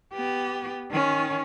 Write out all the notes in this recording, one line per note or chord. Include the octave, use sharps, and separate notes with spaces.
B3 G4
D#3 C#4